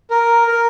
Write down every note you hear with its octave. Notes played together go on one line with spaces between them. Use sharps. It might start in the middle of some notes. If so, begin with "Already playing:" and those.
A#4
A#4